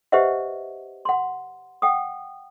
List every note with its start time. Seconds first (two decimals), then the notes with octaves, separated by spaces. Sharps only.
0.12 G4 B4 C5 D#5 E5 F#5
1.05 F#5 C6
1.82 F#5 G5 D#6